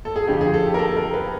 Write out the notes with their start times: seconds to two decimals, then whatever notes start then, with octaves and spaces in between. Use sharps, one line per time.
0.05 A4
0.16 G#4
0.27 F2 D3 F3 G4
0.41 G#4
0.54 A4
0.66 G4
0.74 A#4
0.79 A4
0.97 A#4
1.13 B4